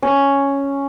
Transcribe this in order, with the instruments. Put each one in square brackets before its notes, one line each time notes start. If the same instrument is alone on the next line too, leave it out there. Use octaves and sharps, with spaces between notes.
[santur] C#4